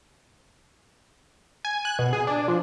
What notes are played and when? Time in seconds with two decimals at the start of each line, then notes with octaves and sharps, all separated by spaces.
1.65 G#5
1.85 F#6
1.99 B2
2.13 G#4
2.27 D4
2.48 F3